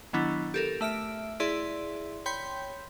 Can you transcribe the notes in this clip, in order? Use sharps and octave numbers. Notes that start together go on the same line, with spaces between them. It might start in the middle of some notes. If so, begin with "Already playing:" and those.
D#3 F#3 B3 D4 E4
G4 A4 A#4
A3 E5 F6 D7
E4 G#4 D5 E5 C6
C#5 G5 B5 C6 G6 B6